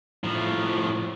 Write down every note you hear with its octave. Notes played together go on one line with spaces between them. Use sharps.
A2 F3